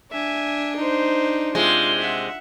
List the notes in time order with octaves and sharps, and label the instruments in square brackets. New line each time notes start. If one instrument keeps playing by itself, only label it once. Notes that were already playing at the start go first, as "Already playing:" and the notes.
[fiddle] D4 [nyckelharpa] E5 G#5
[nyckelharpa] D#4 C5
[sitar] C3 G#3 [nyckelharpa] F4
[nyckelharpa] E5 F#5